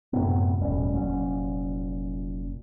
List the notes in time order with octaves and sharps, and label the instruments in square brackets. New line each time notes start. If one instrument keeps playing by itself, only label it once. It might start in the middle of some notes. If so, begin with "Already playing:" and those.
[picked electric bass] F#2 A2 C3 B3
E1 A2 G3 C#4
F1 A#2 F#3 C#4